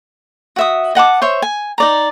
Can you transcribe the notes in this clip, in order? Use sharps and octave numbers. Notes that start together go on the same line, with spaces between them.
F#4 E5 D#6
D#5 F#5 A5 D6
C5 C#5 E5
G#5
D#4 D5 A#5